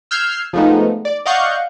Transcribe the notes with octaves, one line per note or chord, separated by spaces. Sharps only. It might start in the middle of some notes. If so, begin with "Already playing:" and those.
E6 F6 G6 G#6 C7
F3 G#3 A3 B3 D#4
D5
D5 D#5 F5 F#5 C#6 G6